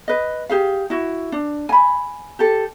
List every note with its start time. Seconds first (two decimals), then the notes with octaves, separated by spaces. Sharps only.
0.08 B4 D#5
0.49 G4 G#4 F5
0.90 E4 F#4
1.32 D4
1.69 G#5 B5
2.39 G4 A4